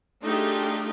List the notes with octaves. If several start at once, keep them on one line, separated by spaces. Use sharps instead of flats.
A3 D4 D#4 F4 G4 G#4